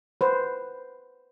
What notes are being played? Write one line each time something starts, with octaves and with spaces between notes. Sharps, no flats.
B4 C5